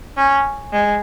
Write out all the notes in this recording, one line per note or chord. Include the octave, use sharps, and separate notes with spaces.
C#4
G#3